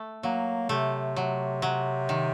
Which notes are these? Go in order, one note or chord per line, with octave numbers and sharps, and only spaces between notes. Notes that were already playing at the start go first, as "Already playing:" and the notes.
Already playing: A3
F#3 A#3
C3 A3
F#3
F#3
D#3